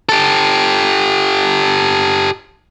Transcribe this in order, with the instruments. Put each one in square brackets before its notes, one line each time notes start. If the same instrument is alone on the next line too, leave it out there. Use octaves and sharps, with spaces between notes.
[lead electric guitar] G4 A4